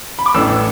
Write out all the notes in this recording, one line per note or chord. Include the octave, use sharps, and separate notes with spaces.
B5
D6
A1 A2 E3 A3 D4 E6